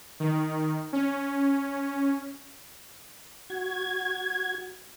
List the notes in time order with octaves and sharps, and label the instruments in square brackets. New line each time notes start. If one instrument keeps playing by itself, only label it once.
[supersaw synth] D#3
C#4
[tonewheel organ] F#4 G#6